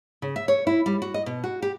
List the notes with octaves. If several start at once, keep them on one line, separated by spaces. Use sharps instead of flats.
C#3
E5
C#5
E4
G3
F#4
D#5
B2
F#4
G4